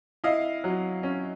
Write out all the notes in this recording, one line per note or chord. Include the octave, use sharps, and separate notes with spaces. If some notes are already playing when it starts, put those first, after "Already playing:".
E4 D#5 F5
F#3
C#4